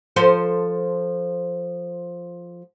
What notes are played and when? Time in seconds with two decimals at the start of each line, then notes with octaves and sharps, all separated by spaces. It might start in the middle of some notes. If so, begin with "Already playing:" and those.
0.16 F3 A4 C5